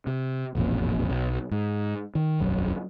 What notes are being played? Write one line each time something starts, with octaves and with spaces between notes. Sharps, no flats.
C3
E1 A1 F2 A#2
B1
G#2
D#3
E1 B1 F#2